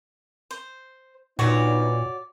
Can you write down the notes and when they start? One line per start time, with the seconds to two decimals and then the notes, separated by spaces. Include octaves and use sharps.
0.51 C5
1.39 A#2 B3 D4 D#4 F#4 C#5 D5